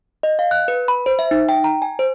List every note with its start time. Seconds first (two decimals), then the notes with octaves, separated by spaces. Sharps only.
0.23 D#5
0.39 F5
0.51 F#6
0.68 B4
0.88 B5
1.06 C5
1.19 E5
1.31 D#4
1.49 G5
1.64 A#5
1.82 G#5
1.99 C5